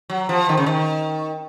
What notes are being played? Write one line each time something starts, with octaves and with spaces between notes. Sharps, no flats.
F#3
F3
D#3
C#3
D#3